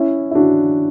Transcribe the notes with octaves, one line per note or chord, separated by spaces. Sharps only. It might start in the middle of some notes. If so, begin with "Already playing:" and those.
Already playing: C#4 E4
E4
D4 F#4